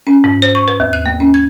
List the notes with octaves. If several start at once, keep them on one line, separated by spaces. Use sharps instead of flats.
C#4
G#2
C5
C#6
B4
D#2
F#6
A#3
C#4
G#6